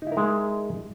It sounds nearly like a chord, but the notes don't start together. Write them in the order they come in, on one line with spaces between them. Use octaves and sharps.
D#4 E4 A#4 G#3